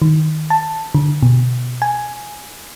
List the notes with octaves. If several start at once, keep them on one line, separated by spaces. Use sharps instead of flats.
D#3
A5
D3
B2
G#5